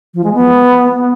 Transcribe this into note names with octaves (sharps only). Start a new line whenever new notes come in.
F3
G#3
B3